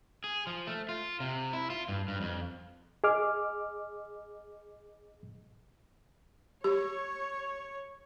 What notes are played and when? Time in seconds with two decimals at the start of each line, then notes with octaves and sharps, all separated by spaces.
0.24 G#4
0.47 F3
0.67 A3
0.89 F4
1.20 C3
1.53 E4
1.70 F4
1.88 G2
2.08 G2
2.21 F2
3.04 G#4 D#5 D6 F6
6.64 G4 C#5